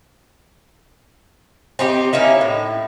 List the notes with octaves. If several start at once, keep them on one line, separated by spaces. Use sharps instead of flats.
C4 D#4 G4
A#3 C#4 D#4 E4
A2